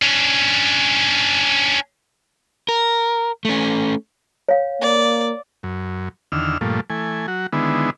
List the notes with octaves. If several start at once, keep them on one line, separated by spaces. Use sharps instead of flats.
C#4 D4
A#4
A3 C#4
C#5 F5
A#3 D5
F#2
E2 D3 D#3 E6 F6
G2 A#2 F3 A3
E3 A3 G#5
F#3 F#4
D3 D#3 G#3 B3 E4